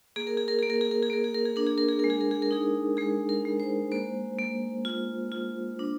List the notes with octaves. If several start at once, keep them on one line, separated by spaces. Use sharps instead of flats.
A#3 G#4
A#4
G#4
A#4
A#3 G#4
A#4
G#4
A#4
G#4
A#3 A#4
G#4
A#4
G#4
D4 A#4
G#4
A#4
G#4
G#3 A#4
G#4
A#4
G#4
A#4
D#4 G#4
G#3 G#4
A#4
G#3
C5
A#3 C5
A#3
F4
F4
D4